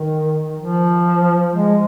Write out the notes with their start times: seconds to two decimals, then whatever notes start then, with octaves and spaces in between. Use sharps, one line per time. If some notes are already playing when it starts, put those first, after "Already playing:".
Already playing: D#3
0.59 F3
1.54 G#3